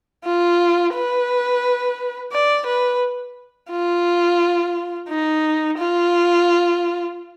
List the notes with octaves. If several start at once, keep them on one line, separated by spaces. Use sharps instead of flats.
F4
B4
D5
B4
F4
D#4
F4